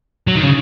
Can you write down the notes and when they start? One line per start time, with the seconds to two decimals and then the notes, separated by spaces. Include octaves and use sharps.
0.27 F#3
0.35 D#3
0.43 C#3